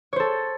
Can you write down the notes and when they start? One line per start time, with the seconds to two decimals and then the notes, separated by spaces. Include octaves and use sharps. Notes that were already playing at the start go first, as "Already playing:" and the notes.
0.13 C#5
0.16 C5
0.20 A4